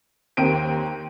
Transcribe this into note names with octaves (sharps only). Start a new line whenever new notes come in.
D#2 C4 A#4 D7 D#7